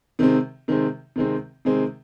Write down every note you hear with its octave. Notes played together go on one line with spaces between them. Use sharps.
C3 D#3 G#3 C4
C3 D#3 G#3 C4
C3 D#3 G#3 C4
C3 D#3 G#3 C4